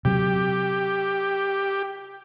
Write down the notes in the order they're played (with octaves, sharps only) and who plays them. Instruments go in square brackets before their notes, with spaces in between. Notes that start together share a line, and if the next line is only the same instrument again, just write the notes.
[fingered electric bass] C3 F#3 [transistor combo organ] G4